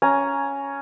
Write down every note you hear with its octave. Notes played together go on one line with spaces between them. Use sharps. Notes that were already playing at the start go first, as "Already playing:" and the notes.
C#4 G#5 A#5